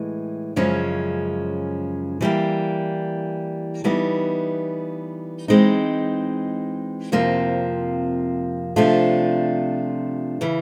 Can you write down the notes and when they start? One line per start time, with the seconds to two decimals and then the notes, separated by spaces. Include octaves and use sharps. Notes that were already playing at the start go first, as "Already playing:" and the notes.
Already playing: A2 E3 G#3
0.56 F#2 C#3 F3 G#3 C#4
2.21 E3 G3 A#3
3.84 E3 G3 B3 D#4
5.48 E3 G#3 C4 D#4
7.12 F2 C3 F3 A#3
8.76 C3 F3 A3 D4 F4
10.41 C#3 E3